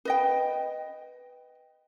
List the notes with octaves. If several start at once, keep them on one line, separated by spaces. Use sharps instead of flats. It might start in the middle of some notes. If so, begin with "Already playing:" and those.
B4 D#5 G5